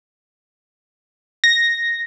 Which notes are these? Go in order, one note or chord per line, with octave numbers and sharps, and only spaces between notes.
A#6